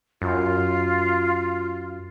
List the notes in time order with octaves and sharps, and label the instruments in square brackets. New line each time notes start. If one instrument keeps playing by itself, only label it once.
[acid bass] F#2 [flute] F4